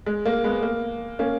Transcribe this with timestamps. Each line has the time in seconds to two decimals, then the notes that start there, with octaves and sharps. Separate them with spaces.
0.06 G#3
0.25 A#3
0.44 G#3 B3
0.63 A#3
1.19 A#3 C#4